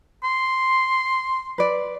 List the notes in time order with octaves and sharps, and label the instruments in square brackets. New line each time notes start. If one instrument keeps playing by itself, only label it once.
[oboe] C6
[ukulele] B4 D5